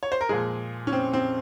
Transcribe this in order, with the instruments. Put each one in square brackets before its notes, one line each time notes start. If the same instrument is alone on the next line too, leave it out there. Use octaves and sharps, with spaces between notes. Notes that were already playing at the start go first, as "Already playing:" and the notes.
[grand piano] C#5
C5
A#4
A#2 F3 G#3 G#4
C#4
C4
C4